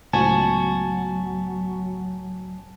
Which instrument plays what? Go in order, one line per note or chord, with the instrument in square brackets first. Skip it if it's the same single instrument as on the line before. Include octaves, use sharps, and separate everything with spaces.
[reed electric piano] C#2 A2 G#5 [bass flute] F#3 [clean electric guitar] B3 F#4 [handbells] A5